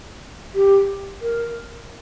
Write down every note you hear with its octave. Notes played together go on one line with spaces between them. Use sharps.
G4
A#4